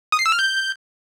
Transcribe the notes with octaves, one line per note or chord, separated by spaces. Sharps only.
D#6
C7
E6
F6
G6